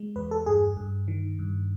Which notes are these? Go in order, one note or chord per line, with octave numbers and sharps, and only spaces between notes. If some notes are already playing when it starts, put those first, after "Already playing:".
Already playing: G#3
E2 B4
A4
G2 G#4
G2
D#3
G2